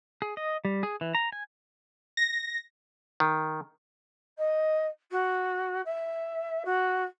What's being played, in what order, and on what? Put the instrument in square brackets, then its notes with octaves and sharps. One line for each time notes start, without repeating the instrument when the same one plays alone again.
[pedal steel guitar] G#4
D#5
G3
G#4
E3
A#5
G#5
[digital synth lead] A#6
[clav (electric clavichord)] D#3
[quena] D#5
F#4
E5
F#4